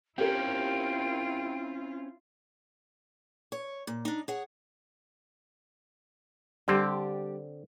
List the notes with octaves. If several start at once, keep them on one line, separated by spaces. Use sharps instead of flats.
C4 C#4 E4 F4 G4 A#4 G5
C#5
A#2
D4 D#4
G#4 C#5 F#5
D3 G3 C4 D4 G4